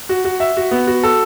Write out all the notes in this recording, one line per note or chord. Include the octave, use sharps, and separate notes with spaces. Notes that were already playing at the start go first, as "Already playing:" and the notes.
F#4
F#4
E5
F#4
B3
F#4
A4